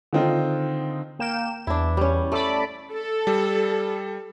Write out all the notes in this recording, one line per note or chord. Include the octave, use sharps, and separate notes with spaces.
D3 D#3 C4 D#4 F4
A#3 G5 E7
E2 D4 E4
G3 C#4
A3 A4 D5 B5
A4
G3